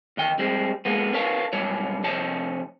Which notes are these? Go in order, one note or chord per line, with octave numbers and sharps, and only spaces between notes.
E2 D#3 G5
G3 G#3 C4
G#3 A#3 B3
A#4 B4 C#5 F5 A5
B1 G#2 G3 C#5
F2 C3 C#5 A5